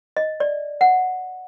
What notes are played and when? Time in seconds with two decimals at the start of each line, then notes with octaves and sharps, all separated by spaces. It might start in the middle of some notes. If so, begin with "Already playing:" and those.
0.17 D#5
0.40 D5
0.81 F#5